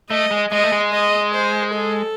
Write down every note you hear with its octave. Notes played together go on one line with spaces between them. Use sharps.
A3 D#5
G#3
G#3 D#5
A3
G#3
D#5
C5
A4